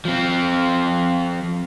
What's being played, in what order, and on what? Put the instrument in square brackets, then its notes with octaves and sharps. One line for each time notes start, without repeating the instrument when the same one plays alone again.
[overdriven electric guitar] F3 C4